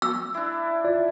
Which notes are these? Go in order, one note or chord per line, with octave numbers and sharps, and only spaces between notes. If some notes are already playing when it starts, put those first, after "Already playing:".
E6
D4 E4
F4 D5